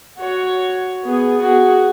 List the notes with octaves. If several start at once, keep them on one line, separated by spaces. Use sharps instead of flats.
F#4 C#5
B3 G#4
F#4 G#4